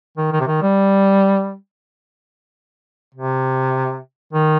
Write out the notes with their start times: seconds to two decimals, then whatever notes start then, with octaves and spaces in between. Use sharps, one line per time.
0.17 D#3
0.32 D#3
0.40 C3
0.47 D#3
0.62 G3
3.15 C3
4.33 D#3